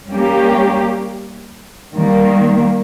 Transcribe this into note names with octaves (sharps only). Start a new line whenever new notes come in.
G3 A#3 C#4 G4
D#3 G3 A#3